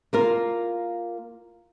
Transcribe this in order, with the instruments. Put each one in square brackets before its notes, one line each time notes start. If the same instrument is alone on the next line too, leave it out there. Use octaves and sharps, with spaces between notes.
[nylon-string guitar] A#3 F4 A#4